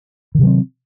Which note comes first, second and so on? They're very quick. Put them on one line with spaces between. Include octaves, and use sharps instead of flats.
D#3 C3 F#3 C4